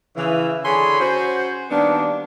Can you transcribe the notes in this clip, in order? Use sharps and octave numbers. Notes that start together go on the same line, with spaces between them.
C#3 E3
D3 G#4 C#5 G#5 B5 C6
C#4 F#4 C5
D#3 G3 A#3 B3 D4